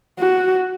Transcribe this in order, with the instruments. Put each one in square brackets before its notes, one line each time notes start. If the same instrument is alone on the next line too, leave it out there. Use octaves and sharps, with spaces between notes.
[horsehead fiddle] F#4